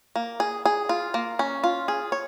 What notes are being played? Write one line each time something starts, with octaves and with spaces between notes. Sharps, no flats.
A#3
G#4
G#4
F4
A#3
C#4
F4
G#4
C#5